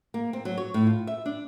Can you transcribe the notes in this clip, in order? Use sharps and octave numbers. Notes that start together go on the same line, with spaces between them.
A#3
C4
F#3
C#5
A2
F4
E5
D4